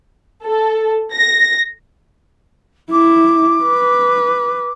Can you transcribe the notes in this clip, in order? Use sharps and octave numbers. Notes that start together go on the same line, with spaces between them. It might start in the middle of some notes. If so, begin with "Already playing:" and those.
A4
A#6
E4 D6
B4